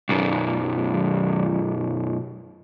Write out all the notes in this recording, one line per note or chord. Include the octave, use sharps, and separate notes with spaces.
B1 F#2